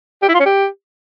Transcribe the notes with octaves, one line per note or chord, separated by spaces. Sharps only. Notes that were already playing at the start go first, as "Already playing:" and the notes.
G4
E4
F4
C#4
G4